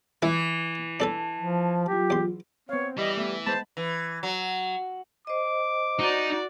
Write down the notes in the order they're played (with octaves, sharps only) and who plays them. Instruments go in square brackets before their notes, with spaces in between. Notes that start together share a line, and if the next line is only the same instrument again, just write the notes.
[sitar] E3 [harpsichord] E4 B4
[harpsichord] D4 A4 B4 [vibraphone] A5
[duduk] F3
[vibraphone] F#3 F4 [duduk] G4
[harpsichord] E2 C6
[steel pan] B3 F5 [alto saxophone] C4 [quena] C#5
[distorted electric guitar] E3 [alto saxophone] G3 [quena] D#5
[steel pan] A3 B3 [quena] E5
[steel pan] G#3 B3 B5 [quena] C5 [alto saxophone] A5
[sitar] E3
F#3
[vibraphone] C5 D#5 [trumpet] D6
[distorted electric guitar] D#4 [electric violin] F#4 D5